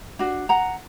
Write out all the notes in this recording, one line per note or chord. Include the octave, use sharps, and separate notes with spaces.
D4 F#4
F#5 A#5